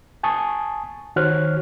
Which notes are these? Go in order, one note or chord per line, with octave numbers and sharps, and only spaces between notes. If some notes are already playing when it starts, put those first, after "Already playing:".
G#5 A5 C#6 D#6
D#3 F#4 C5 C#5 F6 F#6